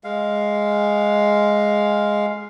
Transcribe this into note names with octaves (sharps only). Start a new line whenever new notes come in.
G#3 F5